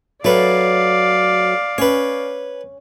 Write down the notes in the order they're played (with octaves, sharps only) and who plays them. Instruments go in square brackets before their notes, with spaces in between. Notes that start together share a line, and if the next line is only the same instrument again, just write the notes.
[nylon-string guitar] F#3 [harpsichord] A3 B4 [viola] D5 F5
[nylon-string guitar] C#4 [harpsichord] B4 C#5